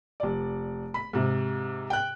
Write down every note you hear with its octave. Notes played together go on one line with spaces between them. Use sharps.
F1 D5
B5
G#2 C3
G5 F#6